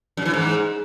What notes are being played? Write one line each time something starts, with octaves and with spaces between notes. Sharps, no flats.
F#2
E3
G#2